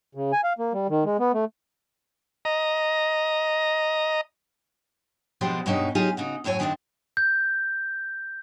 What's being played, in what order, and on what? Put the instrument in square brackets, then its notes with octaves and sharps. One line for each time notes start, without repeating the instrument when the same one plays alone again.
[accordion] C#3
G#5
F5
A#3
G3
D#3
G#3
B3
A3
[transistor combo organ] D#5 A#5
[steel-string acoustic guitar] B2 F3 G#3 C4 D4 G4
G2 B2 G#3 C#4 D#4 E5
F#3 D#4 F4 G4 G#4
C#3 D#4 F#4
F#2 A2 F#3 C#5 G#5
G2 D#3 F3 A#3 C4 D4
[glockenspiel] G6